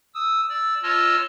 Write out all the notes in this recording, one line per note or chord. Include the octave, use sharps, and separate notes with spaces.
D#6 E6
D5 E6
F4 C#5 D#5 A5 E6 F6